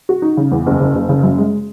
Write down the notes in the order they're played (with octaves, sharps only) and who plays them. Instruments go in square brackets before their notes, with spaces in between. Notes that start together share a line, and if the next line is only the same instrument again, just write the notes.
[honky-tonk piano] F#4
D#4
C#3
E2
F#1
C#3
F#1
C#3
F#2
G#3